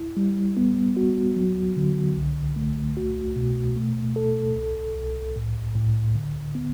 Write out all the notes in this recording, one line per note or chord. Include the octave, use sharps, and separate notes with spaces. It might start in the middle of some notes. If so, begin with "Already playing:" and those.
Already playing: E4
G3
B3
F#4
F#3
D3
C2
A3
F#4
B2
A3
A4
C2
C2
A2
A2
D3
B3